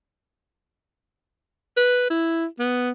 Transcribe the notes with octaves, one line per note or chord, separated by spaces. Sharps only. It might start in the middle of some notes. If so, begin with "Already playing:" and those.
B4
E4
B3